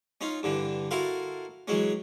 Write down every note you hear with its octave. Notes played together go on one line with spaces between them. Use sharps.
C#4 D#4 F4
G2 D3 E3
E4 F#4 A4 A#4 F5 C6
E3 F#3 G#3 C#4